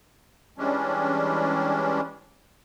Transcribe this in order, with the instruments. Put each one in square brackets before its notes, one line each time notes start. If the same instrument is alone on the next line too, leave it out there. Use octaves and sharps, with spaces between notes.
[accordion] E3 G3 G#3 C#4 D4